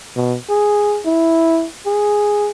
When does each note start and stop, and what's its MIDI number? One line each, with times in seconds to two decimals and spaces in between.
0.16 0.36 47
0.50 1.01 68
1.06 1.66 64
1.86 2.51 68